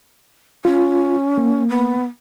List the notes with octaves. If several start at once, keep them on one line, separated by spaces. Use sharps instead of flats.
C#4 F4
A#3
B3